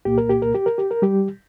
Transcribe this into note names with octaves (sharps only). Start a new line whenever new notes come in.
C2 A#2 A#3 G4
A#4
G4
A#4
G4
A#4
G4
A#4
G3 G4